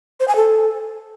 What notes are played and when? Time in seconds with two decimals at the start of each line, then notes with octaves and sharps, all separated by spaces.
0.20 C5
0.28 G#5
0.36 A4